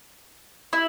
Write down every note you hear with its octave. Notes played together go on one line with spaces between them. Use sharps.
E4